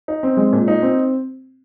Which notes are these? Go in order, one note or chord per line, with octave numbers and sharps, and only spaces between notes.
D#4
C4
G#3
A#2
D#4
C4